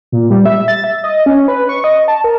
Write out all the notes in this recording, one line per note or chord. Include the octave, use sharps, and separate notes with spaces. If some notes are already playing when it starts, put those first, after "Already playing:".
A#2
G3
E5
A6
E5
D#5
C#4
B4
C#6
D#5
A5
A#4